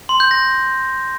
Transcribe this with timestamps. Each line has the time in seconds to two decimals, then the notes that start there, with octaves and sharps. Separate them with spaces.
0.09 C6
0.20 G6
0.31 A#6